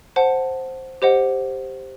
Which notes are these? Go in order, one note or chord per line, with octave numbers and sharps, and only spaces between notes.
C5 F#5 A5
G4 C5 D#5 F#5